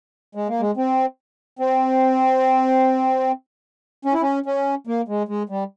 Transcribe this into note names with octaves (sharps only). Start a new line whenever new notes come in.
G#3
A#3
G#3
C4
C4
C#4
E4
C#4
C#4
A#3
G#3
G#3
G3